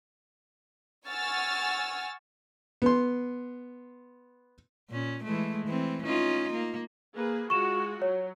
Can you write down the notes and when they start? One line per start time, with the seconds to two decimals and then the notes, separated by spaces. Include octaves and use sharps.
1.07 F#5 G#5 C#6 E6 F6 A6
2.82 B3 C6
4.90 A#2 C#4
5.24 E3 G#3 A3
5.66 E3 C4
6.03 C#4 D#4 F4
6.53 A#3
7.14 A#3 G#4 B4
7.50 G#3 F4 F#4 C#6 E7
8.02 F#3 C#5